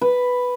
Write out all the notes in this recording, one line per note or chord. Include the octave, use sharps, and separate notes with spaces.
B4